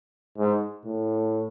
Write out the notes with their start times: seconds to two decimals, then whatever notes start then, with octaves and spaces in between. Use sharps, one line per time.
0.38 G#2
0.85 A2